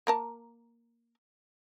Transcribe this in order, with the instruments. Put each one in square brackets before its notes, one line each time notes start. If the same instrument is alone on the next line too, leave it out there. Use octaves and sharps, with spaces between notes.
[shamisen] A#3 A#4 A5